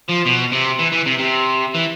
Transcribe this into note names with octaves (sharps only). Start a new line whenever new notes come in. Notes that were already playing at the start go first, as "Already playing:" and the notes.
F3
B2
C3
E3
E3
C3
C3
E3